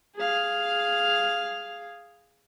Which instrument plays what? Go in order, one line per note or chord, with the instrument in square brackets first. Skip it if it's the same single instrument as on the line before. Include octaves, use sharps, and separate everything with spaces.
[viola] G#4 F5